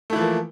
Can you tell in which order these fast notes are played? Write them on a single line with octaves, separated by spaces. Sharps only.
A3 E4 E3 F3 A#3